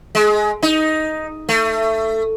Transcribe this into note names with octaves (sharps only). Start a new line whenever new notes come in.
G#3
D#4
A3